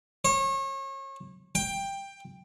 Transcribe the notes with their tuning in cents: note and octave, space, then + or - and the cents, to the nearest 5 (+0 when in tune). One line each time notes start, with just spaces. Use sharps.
C#5 -35
G5 +10